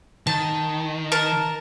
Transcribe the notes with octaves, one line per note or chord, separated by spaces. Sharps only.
D#3 A5
A#4 A5